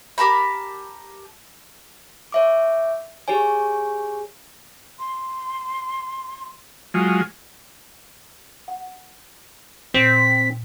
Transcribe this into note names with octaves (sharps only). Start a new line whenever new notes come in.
G4 A#4 A5 B5
C#5 E5 D6
G4 G#4 C#5 G#5
C6
F#3 G#3 F4
F#5
A#2 C4 B6